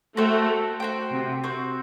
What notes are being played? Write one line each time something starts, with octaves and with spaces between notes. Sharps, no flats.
A3 F#4 A4 C5 G5
F#4 C5 G5
C3
C4 F#4 C5